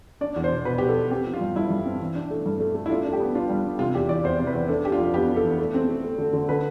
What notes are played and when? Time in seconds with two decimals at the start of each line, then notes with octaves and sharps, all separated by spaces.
0.21 D4 D5
0.36 E2
0.44 C5
0.51 B2
0.65 B2 B4
0.78 B2 G4
0.89 A4
0.96 B3
1.11 C4 G4
1.25 F3
1.34 F4
1.41 G2
1.56 G2 E4
1.70 G2
1.85 C4
2.00 E3
2.15 D4
2.31 A3
2.46 G2
2.60 A3
2.75 A3
2.86 E4
2.90 D4 F4
3.05 D4 A4
3.13 G4
3.20 B3
3.35 D4 F4
3.50 G3
3.64 D4
3.79 C3 F4
3.94 E2 G4
4.09 E3 D5
4.24 E2 C5
4.40 C3
4.47 B4
4.54 E2
4.69 D4 A4
4.85 D4 G4
4.92 F4
4.99 F2
5.14 B3 G4
5.28 D4
5.36 A4
5.44 E3
5.59 A3
5.74 C4
5.89 A3
6.04 A3
6.18 D3
6.33 D3
6.49 D3 B4